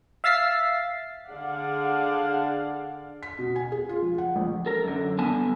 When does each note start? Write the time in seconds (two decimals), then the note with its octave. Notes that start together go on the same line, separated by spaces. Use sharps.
0.24 E5 F5 E6 A6 B6 C7
1.28 D3 D4 G#4 D5 F5 F#5
3.23 B6
3.39 B2
3.56 G#5
3.72 G#4
3.89 F4
4.02 F3
4.18 F#5
4.36 A#1
4.66 A4 A#4
4.84 F#2 D3
5.19 D3 G3 B3 G#5 A5